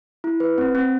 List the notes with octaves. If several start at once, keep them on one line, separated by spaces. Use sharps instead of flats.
E4
B4
C4
C4